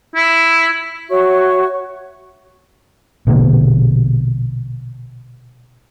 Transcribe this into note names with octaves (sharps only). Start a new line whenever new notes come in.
E4
F#4 C#5 E5 C#6
A#1 B2 D3 A#3